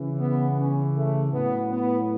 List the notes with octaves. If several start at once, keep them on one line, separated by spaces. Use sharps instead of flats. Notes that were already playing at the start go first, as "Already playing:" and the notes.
Already playing: C#3 E3
B3
C#4
A3
A2 F#3 B3
B3